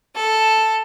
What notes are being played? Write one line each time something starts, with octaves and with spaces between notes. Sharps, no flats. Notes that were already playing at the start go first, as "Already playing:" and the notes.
A4